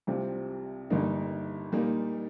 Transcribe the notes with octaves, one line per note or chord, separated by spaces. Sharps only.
C2 C3 G3 C4 F4
G1 G2 G3 A#3 D#4
A#2 G3 A#3 D#4